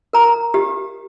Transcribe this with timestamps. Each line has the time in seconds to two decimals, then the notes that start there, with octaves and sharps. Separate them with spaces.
0.13 A#4 A#5
0.54 G4